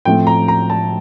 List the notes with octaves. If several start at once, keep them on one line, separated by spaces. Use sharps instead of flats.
A2 F3 A3 C4 G5
A#5
A#5
A5